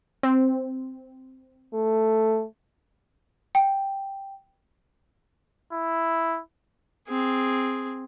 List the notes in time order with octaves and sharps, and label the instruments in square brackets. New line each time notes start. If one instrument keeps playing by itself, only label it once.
[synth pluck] C4
[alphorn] A3
[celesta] G5
[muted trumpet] E4
[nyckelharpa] C4 G#4